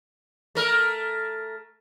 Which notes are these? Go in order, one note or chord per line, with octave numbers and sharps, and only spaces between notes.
A3 A#4